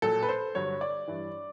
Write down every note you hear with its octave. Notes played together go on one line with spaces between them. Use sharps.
A#2 F#3 A4
B4
C5
G2 D3 F#3 C#5
D5
G2 E3